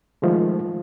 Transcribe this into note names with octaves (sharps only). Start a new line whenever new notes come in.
D#3 F3 G#3 A3